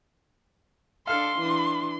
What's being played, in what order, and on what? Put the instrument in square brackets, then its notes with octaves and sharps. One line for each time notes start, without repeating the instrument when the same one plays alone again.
[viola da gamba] D4 A4 [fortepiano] F5 F6 [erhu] C6
[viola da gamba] E3 D4